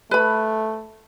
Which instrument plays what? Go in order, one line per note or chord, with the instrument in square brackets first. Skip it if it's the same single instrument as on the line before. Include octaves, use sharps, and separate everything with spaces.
[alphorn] A3 [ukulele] B4 B5